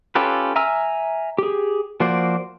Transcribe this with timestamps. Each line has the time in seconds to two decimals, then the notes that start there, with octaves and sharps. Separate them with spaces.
0.15 C#4 F4 G4 A4 B4
0.56 E5 G#5 A#5 E6 F6
1.38 G4 G#4
2.00 F3 A#3 F#4 C5 D5